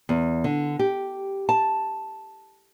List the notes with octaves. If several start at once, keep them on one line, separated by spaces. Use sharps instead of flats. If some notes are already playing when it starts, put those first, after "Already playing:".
E2
D3
G4
A5